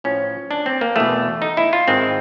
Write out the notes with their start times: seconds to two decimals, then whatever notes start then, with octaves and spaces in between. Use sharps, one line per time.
0.04 A2 F3 C#4
0.51 D4
0.66 C4
0.81 A#3
0.96 E2 B2 A3
1.42 D#4
1.57 E4
1.73 F4
1.88 G#2 D#3 C4